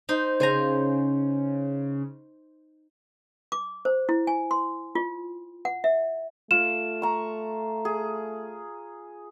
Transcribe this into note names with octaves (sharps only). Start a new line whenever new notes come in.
D#4 C5
C#3 C5 G#5 A#5
D6
C5
E4
G#5
C6
F4
F#5
E5
A3 F4 E7
A#5 C#6
G#4